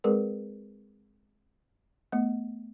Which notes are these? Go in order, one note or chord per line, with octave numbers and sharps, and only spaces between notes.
G#3 C4 G#4 A#4 B4
A3 B3